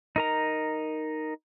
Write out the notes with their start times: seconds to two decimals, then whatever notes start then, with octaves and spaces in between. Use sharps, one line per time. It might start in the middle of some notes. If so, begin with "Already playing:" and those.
0.16 D#4 A#4 A#5